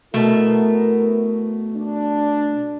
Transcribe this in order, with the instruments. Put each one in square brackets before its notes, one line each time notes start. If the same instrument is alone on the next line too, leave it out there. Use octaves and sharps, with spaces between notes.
[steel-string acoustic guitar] B2 A3 [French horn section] B3 E4 A#4
[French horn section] D4